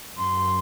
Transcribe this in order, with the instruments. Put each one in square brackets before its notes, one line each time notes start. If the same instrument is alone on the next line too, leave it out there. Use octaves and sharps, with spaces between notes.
[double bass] F#2 [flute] C6